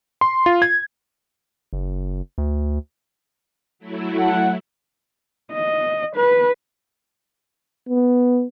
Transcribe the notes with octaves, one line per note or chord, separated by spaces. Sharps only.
C6
F4
G#6
F#1
D2
F#3 A3 E4
A4 F#5
D#5
B4
B3